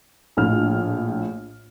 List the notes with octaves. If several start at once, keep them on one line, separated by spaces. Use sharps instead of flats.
A#1 A2 F6